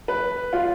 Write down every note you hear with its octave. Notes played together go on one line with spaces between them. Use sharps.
B4
F4